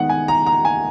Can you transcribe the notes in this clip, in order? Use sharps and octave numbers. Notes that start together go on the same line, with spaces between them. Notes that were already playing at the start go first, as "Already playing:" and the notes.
Already playing: D#3 G#3 B3 F#5
G#5
A#5
A#5
G#5